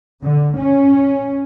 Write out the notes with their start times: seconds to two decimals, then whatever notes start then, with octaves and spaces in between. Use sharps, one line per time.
0.22 D3
0.56 C#4